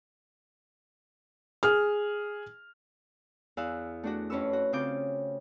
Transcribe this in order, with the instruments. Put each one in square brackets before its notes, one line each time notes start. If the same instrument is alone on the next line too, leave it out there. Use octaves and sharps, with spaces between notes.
[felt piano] G#4 F6
[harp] E2 F5 E6 F#6
A3 D4 F#4
F2 C#4 B4 C#6 E6
F#4
C#3 C4 F4 D6 G6